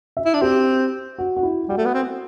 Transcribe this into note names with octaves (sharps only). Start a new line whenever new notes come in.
E5
E4
D4
C4 G4
F#4
F#4
E4
G3 F#4
A3
B3
C4